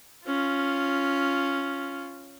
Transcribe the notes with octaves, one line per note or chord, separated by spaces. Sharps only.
C#4 F4